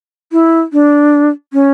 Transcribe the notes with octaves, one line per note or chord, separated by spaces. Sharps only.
E4
D4
C#4